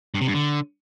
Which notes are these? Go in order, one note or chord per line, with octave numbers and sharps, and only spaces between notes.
G2
C3
G2
D3